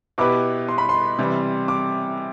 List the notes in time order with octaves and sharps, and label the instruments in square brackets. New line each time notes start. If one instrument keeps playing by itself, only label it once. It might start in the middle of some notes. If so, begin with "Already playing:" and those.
[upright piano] B2 B3 E4 G4 B4 [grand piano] D6
[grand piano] C6
B5
C6
[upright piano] C3 E3 G3
[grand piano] D6